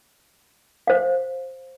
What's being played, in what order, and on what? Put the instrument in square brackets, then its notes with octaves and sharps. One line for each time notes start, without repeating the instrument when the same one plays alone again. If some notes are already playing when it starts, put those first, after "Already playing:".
[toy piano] C5 F5